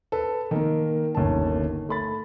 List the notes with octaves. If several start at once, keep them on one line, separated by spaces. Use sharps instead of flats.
A4 B4
D#3 A#3
G1 D#2 C#4 A5
A3 B5 A6